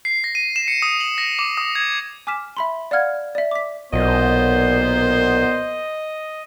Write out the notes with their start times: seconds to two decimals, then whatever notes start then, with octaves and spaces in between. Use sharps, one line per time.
0.05 C7
0.24 A#6
0.35 D#7
0.56 E7
0.68 C#7
0.82 D#6
1.00 F#7
1.18 A#6
1.39 D6
1.57 D#6
1.75 G#6
2.27 G#5 D6 F6 B6 E7
2.57 E5 B5 C6
2.91 D5 F5 F#5 F6 G#6
3.35 D5 E5
3.51 D6 B6
3.93 B1 A#2 B3 C5 D#5